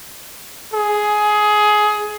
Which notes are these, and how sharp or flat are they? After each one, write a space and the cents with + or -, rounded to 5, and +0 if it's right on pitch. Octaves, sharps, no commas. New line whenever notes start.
G#4 +15